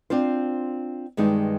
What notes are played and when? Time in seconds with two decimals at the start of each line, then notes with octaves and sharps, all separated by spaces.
0.10 C4 D4 F4 C5
1.17 G2 D#3 G#3 B3 D#4